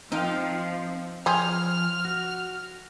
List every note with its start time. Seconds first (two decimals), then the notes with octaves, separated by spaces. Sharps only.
0.12 F3 C4 D#4 F4 F5 G5
1.26 F3 C4 G#4 F6
2.05 F#4